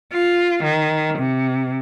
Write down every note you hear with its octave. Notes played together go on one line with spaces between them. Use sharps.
F4
D#3
C3